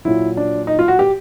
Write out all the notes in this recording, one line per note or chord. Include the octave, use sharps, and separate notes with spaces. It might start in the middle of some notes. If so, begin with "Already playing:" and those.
A#2 F#3 E4
D4
D#4
F4
F#4
G4